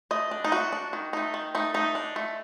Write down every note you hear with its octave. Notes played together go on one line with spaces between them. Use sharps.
A3 D#5
D4
D#4
A3 F#4
D4
D#3
A3 D#4
D#3
A3 D#4
A3 D#4
D4
A3